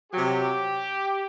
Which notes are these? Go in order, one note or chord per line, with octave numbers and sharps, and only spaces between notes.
C3 F#3 G4